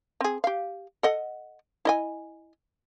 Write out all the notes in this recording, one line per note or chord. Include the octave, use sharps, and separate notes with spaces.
C4 G#4
G4 F5
A4 D#5 F#5
E4 D#5 G#5